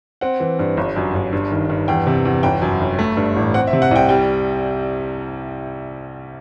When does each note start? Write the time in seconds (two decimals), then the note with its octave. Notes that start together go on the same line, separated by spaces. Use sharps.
0.21 C4 F#5
0.40 E3
0.59 G2
0.77 G1
0.96 F#2
1.14 G1
1.33 G2
1.51 D#3
1.69 G2
1.88 E2 G5
2.07 C3
2.25 E2
2.43 G1 G5
2.62 F#2
2.81 G1
2.99 A3
3.17 G2
3.36 A1
3.54 C4 F#5
3.67 E5
3.73 C3
3.82 F#5
3.91 C2 G5
4.09 G3 G5